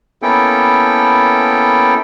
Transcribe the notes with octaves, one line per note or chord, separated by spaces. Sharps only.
A#3 B3 C#4 E4 A4 G5